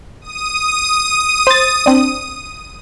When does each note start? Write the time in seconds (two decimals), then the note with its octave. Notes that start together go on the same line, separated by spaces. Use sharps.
0.21 D#6 D#7
1.47 C5 A6
1.86 C4 D4